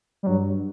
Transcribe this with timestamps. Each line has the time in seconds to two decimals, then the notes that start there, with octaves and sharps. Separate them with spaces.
0.23 G3
0.27 G2 F#3